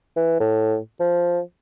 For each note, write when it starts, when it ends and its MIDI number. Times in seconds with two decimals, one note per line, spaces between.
0.16 0.37 52
0.40 0.77 45
1.00 1.40 53